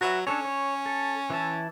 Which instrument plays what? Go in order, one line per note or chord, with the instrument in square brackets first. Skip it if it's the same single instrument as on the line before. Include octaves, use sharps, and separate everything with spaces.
[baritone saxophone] F#3 [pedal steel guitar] F#4 B4 E5
[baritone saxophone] C#4 [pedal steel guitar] D4 A4 C#5
[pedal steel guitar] C#5
A4
E3 E4 A5